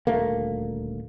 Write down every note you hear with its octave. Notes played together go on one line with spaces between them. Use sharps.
D#1 D2 A3 A#3